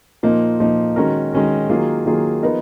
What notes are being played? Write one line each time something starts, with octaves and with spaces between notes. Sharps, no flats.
A#2 F3 A#3 D#4
A#2 F3 A#3 D#4
D#3 G#3 C#4 F#4 A#4
D#3 G#3 C#4 F#4 A#4
D#3 F#3 A#3 F4 G#4
D#3 F#3 A#3 F4 G#4
F3 B3 D#4 A#4